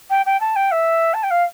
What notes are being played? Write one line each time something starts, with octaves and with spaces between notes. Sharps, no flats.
G5
G5
A5
G5
E5
A5
G5
F5